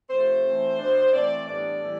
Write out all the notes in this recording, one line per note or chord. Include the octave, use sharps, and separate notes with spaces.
C3 F3 A3 C5
E3 A3 C4
B2 B3 D4
E3 A3 C4 D5
A2 E3 G3 B3 D4 D5
A2 E3 G3